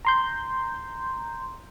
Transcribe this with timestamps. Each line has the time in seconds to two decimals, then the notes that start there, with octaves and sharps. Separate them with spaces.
0.05 A#5 C6 G6